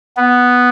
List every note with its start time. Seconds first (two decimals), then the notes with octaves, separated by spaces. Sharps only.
0.17 B3